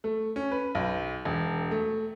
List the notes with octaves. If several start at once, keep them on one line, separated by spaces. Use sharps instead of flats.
A3
C#4
B4
B1
E1
A3